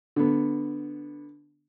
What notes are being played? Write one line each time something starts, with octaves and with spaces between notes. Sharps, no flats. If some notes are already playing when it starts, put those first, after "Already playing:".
D3 B3